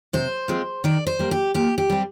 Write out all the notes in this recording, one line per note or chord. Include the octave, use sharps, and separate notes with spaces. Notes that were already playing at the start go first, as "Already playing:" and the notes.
C3 C5
F3 G#3 C4
D#3 D5
C5
G3 A#3
G4
A#2 G4
G4
G3 C4